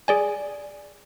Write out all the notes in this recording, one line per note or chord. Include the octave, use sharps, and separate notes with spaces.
G#4 D5 G#5